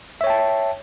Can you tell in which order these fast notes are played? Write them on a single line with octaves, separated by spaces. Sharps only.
E5 C#5 G5 A5